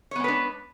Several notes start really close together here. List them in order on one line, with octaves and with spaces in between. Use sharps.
C#5 B3 G#3 B4 D4